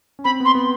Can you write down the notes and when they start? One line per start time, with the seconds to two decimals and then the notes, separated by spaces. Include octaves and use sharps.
0.19 C#4
0.25 C4 B5
0.40 B3 C6
0.55 B3